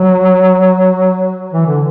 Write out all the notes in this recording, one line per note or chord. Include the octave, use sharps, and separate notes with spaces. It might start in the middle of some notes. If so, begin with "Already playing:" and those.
Already playing: F#3
E3
D3